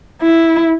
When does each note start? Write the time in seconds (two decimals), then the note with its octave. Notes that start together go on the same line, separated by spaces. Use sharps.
0.22 E4